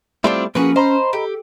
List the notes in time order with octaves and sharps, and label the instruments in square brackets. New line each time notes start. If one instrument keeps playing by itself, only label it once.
[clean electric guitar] G3 A3 E4 [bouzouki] C4 D4 F4
[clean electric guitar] F3 A#3 [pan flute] C#4 [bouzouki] F#4 G#4 B4
[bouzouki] C5 [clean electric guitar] D#5 A#5 B5
[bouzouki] G4 [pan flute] A4